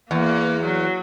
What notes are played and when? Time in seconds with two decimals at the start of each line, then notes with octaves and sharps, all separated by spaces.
0.10 E2 A#3
0.64 F#3